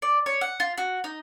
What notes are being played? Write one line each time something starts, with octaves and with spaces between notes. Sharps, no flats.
D5
C#5
F#5
F4
F#4
D#4